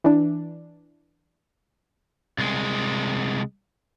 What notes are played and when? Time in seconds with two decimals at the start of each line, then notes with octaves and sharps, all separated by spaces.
0.04 E3 D4
2.38 C2 G#3